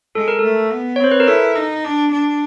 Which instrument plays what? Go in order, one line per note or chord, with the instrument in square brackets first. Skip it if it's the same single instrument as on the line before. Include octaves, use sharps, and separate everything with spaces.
[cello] G#3 [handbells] A4
[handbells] A#4
[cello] A3 [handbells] A4
[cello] B3
[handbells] C#5
[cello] C4 [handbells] C5
[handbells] B4
A#4
[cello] E4 [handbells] A4
[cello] D#4
D4
D4